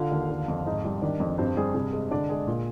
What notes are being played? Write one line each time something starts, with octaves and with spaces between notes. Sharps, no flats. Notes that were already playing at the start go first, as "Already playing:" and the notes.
Already playing: D3 F4 F5
D#2
D3
F2
G#2 D#4 D#5
G3
D#3 D4 D5
F2
G2 C4 C5
G3 G#4
C3 G#4
G#3
D3 D4 D5
G#3 G#4
A#2